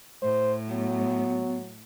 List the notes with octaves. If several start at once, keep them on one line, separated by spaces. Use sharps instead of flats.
A2 C5
F#3 B3